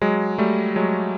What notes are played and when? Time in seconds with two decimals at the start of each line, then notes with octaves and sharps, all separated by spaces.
0.02 F#3 G#3
0.38 G3 A3
0.76 F#3 G#3